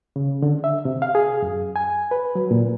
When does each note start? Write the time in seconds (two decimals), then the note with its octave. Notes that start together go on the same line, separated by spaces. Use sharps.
0.16 C#3
0.42 D3
0.64 E5
0.85 C3
1.02 F5
1.15 G#4
1.42 F#2
1.76 G#5
2.11 B4
2.35 F#3
2.51 A#2